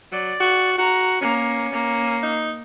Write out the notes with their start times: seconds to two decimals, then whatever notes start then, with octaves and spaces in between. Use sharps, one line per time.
0.12 F#3 D5
0.41 F#4
0.78 F#4 A#5
1.21 A#3 C#4
1.73 A#3
2.23 D#4